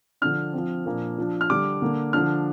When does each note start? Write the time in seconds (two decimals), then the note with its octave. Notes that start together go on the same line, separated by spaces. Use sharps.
0.22 D3 F3 D4 F6
0.53 F3 C4
0.86 A#2 F3 A#3 D4
1.18 F3 D4
1.41 F6
1.50 D3 G3 D4 D6
1.82 D3 A#3 D4
2.13 D3 F3 D4 F6